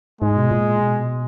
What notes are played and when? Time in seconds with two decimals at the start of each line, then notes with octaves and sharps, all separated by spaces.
0.21 G#2 G#3
0.37 B2
0.51 A#2
0.81 B2